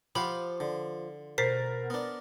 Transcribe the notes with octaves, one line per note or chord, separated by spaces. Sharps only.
F3 G4 F5 F#5 B5
D3
B2 A#4 C5 A6 B6 C7
B3 D4